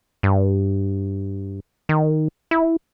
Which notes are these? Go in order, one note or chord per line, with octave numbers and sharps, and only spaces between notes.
G2
D#3
E4